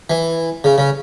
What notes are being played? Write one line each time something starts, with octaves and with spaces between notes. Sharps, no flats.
E3
C#3
C#3